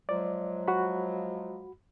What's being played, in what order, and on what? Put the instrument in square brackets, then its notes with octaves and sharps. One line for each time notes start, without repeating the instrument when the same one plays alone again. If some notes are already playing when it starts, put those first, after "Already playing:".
[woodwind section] F3 F#3 G#3 [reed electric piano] D5
[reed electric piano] F#4 B5